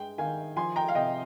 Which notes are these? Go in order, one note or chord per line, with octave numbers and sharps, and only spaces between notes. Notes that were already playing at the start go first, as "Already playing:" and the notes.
Already playing: G2 G#3 G5
D#3 F5 G#5
F3 G#5 C6
G5 A#5
F5
C3 D#5 G5